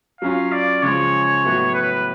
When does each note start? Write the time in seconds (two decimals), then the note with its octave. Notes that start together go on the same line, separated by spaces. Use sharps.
0.21 F#3 C#4 F4 F5
0.52 D5
0.82 C#3 F3 G#3 C#5
1.44 A2 F#3 B3 F#4
1.74 B4